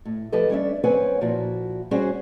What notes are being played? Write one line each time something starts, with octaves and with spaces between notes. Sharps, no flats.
A2
F3 G4 A4 B4 D#5
G3 C#4 D4 E5
F#2 C4 B4 C#5 F#5 G#5
A#2 F3 E4 F#4
G3 C#4 F#4 G#4 C5